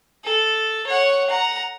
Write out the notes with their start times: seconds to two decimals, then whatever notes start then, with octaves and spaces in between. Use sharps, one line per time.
0.24 A4
0.87 C#5 F#5
1.29 F#5 A#5